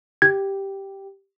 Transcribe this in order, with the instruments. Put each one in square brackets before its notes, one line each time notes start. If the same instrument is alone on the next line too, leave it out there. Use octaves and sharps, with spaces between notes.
[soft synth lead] G4 [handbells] G#6